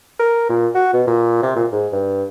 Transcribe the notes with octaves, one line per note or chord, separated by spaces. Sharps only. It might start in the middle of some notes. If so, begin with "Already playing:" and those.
A#4
A#2
F#4
B2
A#2
C3
A#2
G#2
G2